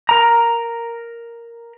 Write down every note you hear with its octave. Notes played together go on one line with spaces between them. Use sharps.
A#4 A#5